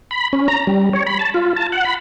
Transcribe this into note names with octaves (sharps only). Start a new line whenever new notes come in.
B5
C#4
A#5
G3
C#5
B5
A5
F4
A5
F#5
B5